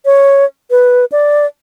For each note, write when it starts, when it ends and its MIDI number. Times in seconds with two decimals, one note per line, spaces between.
0.05 0.45 73
0.71 1.05 71
1.12 1.46 74